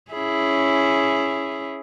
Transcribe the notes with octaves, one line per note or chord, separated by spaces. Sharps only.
C#4 E4 G#4